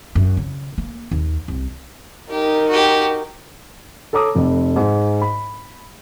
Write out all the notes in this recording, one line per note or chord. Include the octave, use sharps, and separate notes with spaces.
F#2
C#3
A#3
D#2
C2
D#4 G4 A#4
F#4 G4
A4 C#5 A#5 D6 D#6
F1 F2
G#2
B5